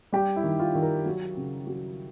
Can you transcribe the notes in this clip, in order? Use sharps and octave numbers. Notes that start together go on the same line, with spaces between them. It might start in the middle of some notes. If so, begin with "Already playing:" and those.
G3 G4
E4
D#3
F4
D#3
A#4
F#3
C#3
F#3